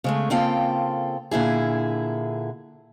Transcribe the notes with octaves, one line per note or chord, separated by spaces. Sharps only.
C#3 G#3 A3
C#3 A#3 C4 F4 A4 G5
A#2 D3 E4 G#4